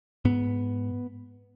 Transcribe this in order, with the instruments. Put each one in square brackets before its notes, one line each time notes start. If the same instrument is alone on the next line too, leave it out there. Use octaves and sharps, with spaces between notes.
[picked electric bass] G#2 B3